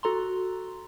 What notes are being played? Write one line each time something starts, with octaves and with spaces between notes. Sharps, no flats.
F#4 A4 A#5 C6